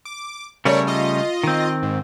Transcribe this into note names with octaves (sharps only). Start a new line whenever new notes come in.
D6
C#3 G3 A3 A#4 C#5 D5
F4 D#5
D#3 C4
G#2